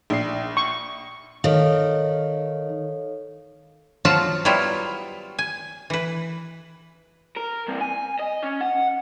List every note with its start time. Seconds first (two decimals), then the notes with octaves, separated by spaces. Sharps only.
0.10 A#1 D4 C7
0.57 C#6
1.44 D#3 A4 C#5 F5
4.05 F3 F#3 F4 F#4 A5
4.45 F#3 G3 B3 E4 F4
5.39 G#5
5.90 E3 B4
7.37 A#4
7.68 G2 C3
7.81 G#5
8.20 D#5
8.43 C#4
8.61 F#5